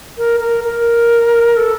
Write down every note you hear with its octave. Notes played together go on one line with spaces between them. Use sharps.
A#4
A#4
A#4
A4